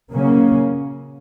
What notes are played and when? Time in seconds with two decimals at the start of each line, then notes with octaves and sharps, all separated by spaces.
0.12 C#3 F#3 A#3 C#4